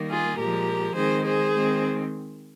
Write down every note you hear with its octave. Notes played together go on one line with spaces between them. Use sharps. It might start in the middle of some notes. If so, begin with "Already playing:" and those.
Already playing: D#3 G3 A#3
F4 G#4
A#2 F3 G#3 G4 A#4
D#3 G#3 C4 G#4 C5
G#4 C5
D#3 G#3 C4